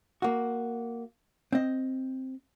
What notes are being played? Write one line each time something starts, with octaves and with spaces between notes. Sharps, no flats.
A#3 F#4
C4 D#5